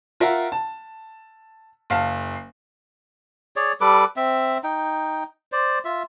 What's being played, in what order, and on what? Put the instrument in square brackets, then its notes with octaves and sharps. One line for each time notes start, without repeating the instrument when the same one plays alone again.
[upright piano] F4 A#4 E5 F#5
A5
F#1 F5 A5
[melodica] G#4 C#5 D5
G3 A4 B4 D6
C4 E5
D#4 G5
C5 D5
F4 E5